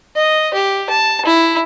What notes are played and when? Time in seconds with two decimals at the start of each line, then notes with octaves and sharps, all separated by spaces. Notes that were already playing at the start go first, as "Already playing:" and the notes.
0.16 D#5
0.54 G4
0.89 A5
1.25 E4